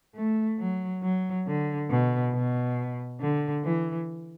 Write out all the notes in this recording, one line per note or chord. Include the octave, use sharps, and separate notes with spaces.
A3
F#3
F#3
D3
B2
B2
D3
E3